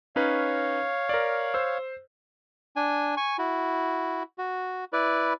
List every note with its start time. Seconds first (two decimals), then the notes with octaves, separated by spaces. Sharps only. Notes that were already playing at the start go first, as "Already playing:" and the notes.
0.16 C#4 D#4 B4 C#5 F5
1.09 A#4 D5
1.54 C5 E6
2.76 D4 G#5
3.17 G#5 C#6
3.38 E4 F#4
4.38 F#4
4.93 E4 B4 D5